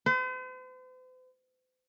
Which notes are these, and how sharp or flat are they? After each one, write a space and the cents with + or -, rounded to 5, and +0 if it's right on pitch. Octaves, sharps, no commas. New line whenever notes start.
C5 -45